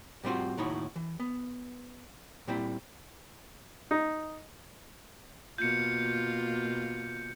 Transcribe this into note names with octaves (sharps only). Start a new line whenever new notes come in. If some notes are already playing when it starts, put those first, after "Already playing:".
A2 G3 C4 F4 F#4
D#2 A2 D#4 E4 F#4 C#5
E3
B3
A#2 G3 C4 E4
D#4
B2 A#3 F4 G6 C#7